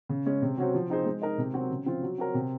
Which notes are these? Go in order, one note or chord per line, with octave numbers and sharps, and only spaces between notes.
C#3
G#3 C#4
C3
F#3 C#4 F#4 C5
F3
C4 D#4 G#4 C5
G#3
D#4 A#4 D#5
C3
F#3 C4 F#4
C#3
F3 C4 F4
F#3
C4 F#4 A#4 C#5
C3